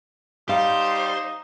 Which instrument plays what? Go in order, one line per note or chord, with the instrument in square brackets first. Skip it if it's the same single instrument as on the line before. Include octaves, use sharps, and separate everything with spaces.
[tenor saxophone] G3 [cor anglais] D#4 [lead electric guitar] C5 [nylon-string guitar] F5